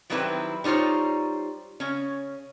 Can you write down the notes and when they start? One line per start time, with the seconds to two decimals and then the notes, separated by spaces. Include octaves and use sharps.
0.10 D#3 F#3 G3 C4 E4 B4
0.64 G3 D#4 F4 C5 C#5
1.80 C#3 C#4